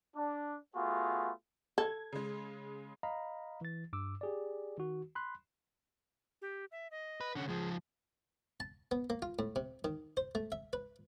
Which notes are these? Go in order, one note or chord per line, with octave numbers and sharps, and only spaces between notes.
D4
A3 B3 F4 F#4 G#4
A4 G#6
C#3 G#3
D#5 F5 A#5 B5
E3 A6
G2 D6 E6
G4 G#4 D5
D#3 F#4
B5 C6 F#6
G4
E5
D#5
B4
D3 C#4 F#5
C#2 F3 G#4
A5
B3
A#3
F4
A2
C3
D#3
C5
A3
E5
B4